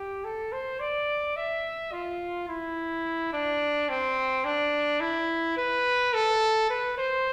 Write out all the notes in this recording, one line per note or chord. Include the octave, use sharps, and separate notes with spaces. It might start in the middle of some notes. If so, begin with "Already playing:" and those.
Already playing: G4
A4
C5
D5
E5
F4
E4
D4
C4
D4
E4
B4
A4
B4
C5